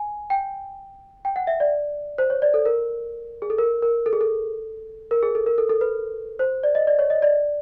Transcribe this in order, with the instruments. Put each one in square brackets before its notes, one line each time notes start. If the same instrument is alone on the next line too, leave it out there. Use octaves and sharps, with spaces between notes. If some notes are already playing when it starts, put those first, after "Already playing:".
Already playing: [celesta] G#5
G5
G5
F#5
E5
D5
C5
C#5
D5
A4
A#4
G#4
A4
A#4
A#4
A4
G#4
A4
A#4
G#4
A4
A#4
A4
A4
B4
C5
D5
D#5
D5
C#5
D#5
D5